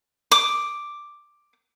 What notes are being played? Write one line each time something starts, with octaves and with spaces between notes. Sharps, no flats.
D6 D#6